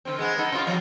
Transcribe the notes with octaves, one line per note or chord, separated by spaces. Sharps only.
D3 C4
G#3 B3
B3 D#4 A4
C3 F4
B2 F3 G3